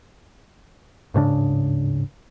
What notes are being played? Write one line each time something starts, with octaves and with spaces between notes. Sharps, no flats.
D1 G#2 C#3 D4